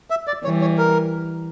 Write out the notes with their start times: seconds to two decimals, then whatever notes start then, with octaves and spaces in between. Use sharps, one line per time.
0.10 E5
0.27 D5
0.44 E3 G3 C#5
0.61 C#5
0.78 A#4